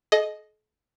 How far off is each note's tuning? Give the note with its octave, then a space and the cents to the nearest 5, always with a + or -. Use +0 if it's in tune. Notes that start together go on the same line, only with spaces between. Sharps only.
A4 -45 D#5 +0